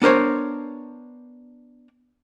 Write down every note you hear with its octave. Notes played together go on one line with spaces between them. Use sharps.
B3 D4 A#4 C5 C#5